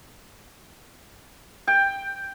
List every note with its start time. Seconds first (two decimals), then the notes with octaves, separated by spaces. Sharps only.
1.68 G5